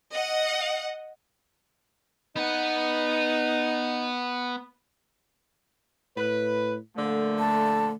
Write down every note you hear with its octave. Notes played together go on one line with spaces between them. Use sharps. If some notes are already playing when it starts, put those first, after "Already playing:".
D#5 F#5
B3 D#4 F#5
A2 B4
A#2 D3 F3 A3
A5